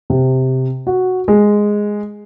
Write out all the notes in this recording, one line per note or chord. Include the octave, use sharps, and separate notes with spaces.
C3
F#4
G#3